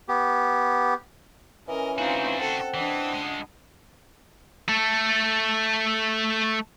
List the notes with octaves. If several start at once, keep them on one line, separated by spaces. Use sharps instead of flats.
B3 G4
E3 C#4 A#4 D#5
C4 D4 D#4 F4 F#4
C4 A4 F#5
E3 D4 D#5
C#2 G#3
A3 A4